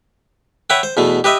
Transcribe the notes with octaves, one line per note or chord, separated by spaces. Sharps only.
B4 C#5 E5 F#5 G5
C5
E2 B2 A3
G4 B4 D#5 E5